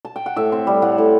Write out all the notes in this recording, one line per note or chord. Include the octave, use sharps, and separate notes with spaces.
A5
G5
F#5
A2 E5
C4
G3
A2 F#5
A2